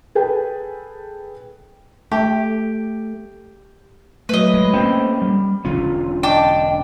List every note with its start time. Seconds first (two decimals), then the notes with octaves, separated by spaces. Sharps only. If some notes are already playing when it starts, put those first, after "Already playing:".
0.15 G#4 A4 B4 G5
2.12 A3 G4
4.29 F#3 A3 B4 D#5
4.54 G#3
4.73 A3 A#3 C4 C#4 C5 G5
5.22 G3
5.65 E1 D3 C#4 F4
6.23 D4 D#5 G5 A5 D6